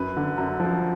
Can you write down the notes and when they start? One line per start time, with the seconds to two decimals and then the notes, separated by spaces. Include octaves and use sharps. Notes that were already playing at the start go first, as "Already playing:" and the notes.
Already playing: F#2 B4
0.17 D3
0.38 F#2
0.60 F3